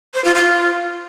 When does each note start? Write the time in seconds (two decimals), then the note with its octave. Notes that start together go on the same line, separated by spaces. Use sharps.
0.14 C5
0.24 F4
0.35 F4